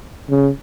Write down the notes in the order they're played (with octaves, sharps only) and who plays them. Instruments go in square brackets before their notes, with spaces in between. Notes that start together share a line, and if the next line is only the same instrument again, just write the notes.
[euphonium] C#3